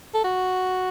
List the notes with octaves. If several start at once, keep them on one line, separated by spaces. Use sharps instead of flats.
A4
F#4